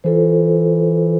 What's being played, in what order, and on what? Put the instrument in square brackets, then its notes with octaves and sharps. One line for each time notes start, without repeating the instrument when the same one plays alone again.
[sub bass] E3 [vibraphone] F4 A4 C5